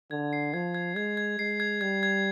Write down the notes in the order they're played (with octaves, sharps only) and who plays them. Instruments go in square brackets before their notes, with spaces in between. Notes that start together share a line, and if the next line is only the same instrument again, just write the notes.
[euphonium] D3 [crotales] G#6
[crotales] C7
[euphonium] F3 [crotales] G#6
[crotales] G#6
[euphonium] G#3 [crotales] G#6
[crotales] G#6
[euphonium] G#3 [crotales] C7
[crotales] G#6
[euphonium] G3 [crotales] G#6
[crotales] G#6